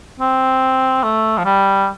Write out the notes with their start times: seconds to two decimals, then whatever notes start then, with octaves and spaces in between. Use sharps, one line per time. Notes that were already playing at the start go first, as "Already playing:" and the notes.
0.20 C4
1.03 A3
1.38 F3
1.45 G3